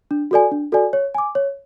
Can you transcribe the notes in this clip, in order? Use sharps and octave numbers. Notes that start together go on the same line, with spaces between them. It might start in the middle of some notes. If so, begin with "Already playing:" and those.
D4
F#4 A4 D5 G#5
D4
F#4 A4 D5 G#5
C#5
G#5 D6
C#5